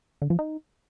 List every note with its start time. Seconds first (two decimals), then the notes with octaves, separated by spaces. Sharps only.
0.22 D3
0.30 F3
0.39 D#4